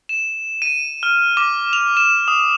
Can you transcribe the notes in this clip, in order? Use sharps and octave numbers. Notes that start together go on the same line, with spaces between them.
E7
D#7
F6
D6
F7
E7
D#6